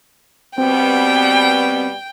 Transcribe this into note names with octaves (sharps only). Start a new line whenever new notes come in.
B2 G3 B3 C4 G5